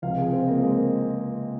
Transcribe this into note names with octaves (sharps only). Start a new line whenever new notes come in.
C#2 C3 F3 F5
G#4
C4
A#3
G#3